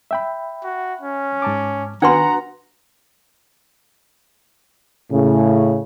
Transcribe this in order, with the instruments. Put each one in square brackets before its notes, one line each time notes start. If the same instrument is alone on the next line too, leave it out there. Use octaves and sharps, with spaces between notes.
[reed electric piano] E5 G5 B5
[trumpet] F#4
C#4
[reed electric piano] G#2 A5 D6
[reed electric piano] D#3 [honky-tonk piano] B3 F#4 F#5 [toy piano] D4 B4 C6 [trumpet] A#5
[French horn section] A2 C#3